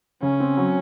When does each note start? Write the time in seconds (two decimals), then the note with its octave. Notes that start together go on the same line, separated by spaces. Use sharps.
0.22 C#3 C#4
0.40 C4
0.57 F#3